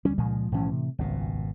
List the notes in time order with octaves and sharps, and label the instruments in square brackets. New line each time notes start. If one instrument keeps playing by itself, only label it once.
[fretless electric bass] E1 D2 G3 [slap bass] C#4
[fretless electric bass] C#2 [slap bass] A#2 F3 G#3
[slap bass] B1 F3 C#4 [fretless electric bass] A2 E3
[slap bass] C3
[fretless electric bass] D#1 C#2 [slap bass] G#1 B2